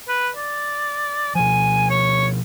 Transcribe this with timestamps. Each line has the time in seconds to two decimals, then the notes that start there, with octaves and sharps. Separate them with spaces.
0.09 B4
0.37 D5
1.35 B2 F3 G#5
1.90 C#5